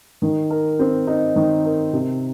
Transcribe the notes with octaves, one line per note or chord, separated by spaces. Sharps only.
D#3
A#4
C4
D#4
D#3
A#4
C3